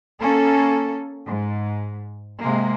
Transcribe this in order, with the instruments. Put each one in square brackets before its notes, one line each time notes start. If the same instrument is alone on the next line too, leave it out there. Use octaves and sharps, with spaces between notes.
[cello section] A#3 C#4 A4
G#2
C3 G#3 A#3